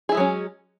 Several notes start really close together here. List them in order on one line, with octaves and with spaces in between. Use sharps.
G#4 E4 G#3 F#3 C#4